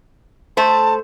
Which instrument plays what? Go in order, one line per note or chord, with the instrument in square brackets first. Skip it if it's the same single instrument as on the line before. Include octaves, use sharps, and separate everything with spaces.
[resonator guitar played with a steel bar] A3 C5 [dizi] A5